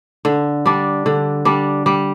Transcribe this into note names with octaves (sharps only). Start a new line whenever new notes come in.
D3
G3 D4
D3
G3 D4
G3